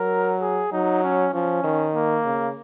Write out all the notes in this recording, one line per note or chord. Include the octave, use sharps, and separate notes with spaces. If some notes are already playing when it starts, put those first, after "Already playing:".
Already playing: F#3 A#4
G#4
F#3 D#4
C#4
F3 C#4
D#3
A#3
C#3